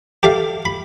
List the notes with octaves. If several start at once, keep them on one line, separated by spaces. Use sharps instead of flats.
G4 A4 E5 F5
B5